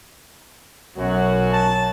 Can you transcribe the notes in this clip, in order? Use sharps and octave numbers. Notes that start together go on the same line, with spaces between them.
B1 F#2 F#3 F#4
A5